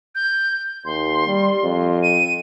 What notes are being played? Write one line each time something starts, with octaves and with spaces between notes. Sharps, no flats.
G6
D#2 C6
G3
F2
D#7